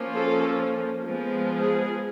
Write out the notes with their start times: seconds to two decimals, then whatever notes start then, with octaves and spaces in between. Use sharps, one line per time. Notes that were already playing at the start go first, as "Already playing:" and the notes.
Already playing: F3 A#3 C#4
0.16 A4
1.03 F3 G#3 B3
1.61 G#4